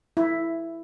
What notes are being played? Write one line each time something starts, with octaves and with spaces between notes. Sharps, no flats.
E4